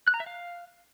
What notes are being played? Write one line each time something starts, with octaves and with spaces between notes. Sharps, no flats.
F#6
A#5
E5
F5